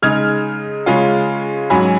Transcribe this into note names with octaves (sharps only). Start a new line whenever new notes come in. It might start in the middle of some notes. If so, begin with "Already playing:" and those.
C#3 G#3 D#4 F6 G#6
C#3 G#3 C#4 F4
G#2 F#3 C#4 G#5 B5